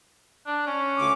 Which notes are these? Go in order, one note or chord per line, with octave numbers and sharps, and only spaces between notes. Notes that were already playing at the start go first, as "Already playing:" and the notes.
D4
C#4
D2 D3 D6